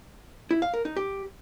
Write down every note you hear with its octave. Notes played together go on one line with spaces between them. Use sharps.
E4
F5
A#4
D#4
G4